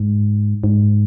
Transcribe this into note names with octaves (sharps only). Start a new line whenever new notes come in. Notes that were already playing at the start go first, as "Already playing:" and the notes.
Already playing: G#2
G#2